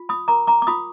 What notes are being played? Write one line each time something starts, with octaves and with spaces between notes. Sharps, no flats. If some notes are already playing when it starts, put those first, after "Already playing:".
Already playing: F4
B5 D#6
A#4 A#5 D6
A#5 D6
D6
F4 B5 D#6